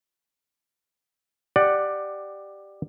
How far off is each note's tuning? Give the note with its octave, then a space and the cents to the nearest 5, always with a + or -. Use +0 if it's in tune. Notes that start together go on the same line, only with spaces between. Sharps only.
G4 +0 D5 +15 F#5 +0